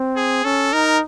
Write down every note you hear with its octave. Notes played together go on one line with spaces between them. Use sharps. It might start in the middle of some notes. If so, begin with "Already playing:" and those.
Already playing: C4
G#4
C#4 A4
D#4 A#4